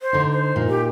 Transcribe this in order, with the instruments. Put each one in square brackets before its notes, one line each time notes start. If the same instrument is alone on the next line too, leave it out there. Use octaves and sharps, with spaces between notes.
[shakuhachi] C5
[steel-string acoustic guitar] D3 D#4
[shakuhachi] C5
[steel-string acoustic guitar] A#2 D#4
[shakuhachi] G4